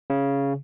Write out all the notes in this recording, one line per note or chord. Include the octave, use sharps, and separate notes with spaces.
C#3